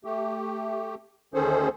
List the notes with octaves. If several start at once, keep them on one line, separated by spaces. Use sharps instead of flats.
A3 G4
D2 D#3 C#4 G#4 A4 C5